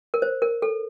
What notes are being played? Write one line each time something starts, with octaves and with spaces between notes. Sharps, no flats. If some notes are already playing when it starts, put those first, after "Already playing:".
A#4
C5
A#4
A4